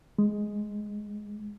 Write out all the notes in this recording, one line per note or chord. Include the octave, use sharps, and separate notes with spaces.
G#3